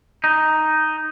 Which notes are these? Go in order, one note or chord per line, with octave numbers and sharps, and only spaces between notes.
D#4